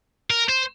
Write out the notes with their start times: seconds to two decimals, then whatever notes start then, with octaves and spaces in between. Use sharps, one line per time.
0.30 A#4
0.49 C5